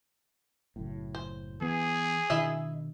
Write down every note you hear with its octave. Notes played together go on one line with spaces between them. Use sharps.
F#1 F#2 A2
C5
E3 B3 G#4
B2 D#3 D4 E4 D#5 E5